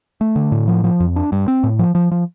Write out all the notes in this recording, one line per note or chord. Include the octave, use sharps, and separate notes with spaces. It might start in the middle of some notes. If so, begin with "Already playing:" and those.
A3
D3
A2
F3
F3
F2
D4
G2
C4
A2
F3
F3
F3